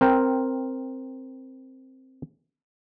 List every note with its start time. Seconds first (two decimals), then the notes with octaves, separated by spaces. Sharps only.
0.01 C4 A#4 G5